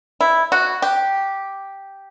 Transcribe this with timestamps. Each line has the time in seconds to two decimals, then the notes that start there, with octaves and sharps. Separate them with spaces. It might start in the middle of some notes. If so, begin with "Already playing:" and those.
0.21 E4
0.52 F#4
0.82 G4